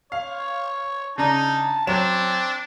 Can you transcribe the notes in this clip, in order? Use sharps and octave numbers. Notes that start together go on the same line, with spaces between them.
C#5 F5
C#3 D4 D#4 A5 A#5
F#3 C4 D4 C#5 E7